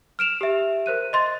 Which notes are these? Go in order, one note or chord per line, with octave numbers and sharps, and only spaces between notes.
F6 D7 E7 F7
G4 E5
A#4 C5 F#6 D#7
D#5 C6 A6